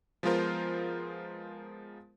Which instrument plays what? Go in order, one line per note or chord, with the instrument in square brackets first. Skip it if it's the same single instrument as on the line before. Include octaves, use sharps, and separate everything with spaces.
[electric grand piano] F3 G#3 B3 F4 A#4 C5